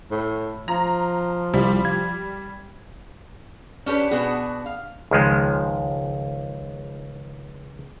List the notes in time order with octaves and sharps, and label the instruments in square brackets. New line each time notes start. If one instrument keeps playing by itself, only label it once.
[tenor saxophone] A2
[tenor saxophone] F3 [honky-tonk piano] A#5
[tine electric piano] C2 [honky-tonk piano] G3
[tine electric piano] G#6
[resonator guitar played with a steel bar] C#4 D4 G4 A#4 B4
B2 B3 D4 F#4 G#4
F5
[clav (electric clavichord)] C#2 D#3 F3 G#3